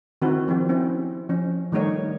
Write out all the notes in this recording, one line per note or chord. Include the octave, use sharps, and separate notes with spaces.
D#3 C4 E4 F#4 B4
F3 C4 F4 G4
C4 C#4 E4
F3 C#4
D#3 G3 A3 D#4 C#5